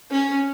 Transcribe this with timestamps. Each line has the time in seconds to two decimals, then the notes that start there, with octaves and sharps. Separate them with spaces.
0.11 C#4